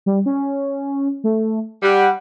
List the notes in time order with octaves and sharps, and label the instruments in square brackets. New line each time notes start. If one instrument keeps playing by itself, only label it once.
[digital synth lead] G3
C#4
A3
[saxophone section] G3 [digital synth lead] F#5